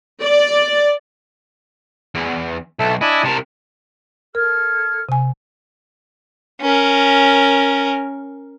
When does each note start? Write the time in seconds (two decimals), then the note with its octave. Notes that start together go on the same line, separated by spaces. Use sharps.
0.22 D5
2.15 E2
2.79 B1 A4 E5
3.01 D4 E4 D#5 G#5
3.24 C3 A#4 A5
4.35 A4 A#4 F6 G#6
5.09 C3 G#5
6.61 C#4 A#4